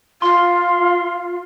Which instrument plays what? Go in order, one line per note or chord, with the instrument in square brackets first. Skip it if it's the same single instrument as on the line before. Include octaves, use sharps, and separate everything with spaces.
[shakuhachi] F4 [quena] F5 [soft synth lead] C6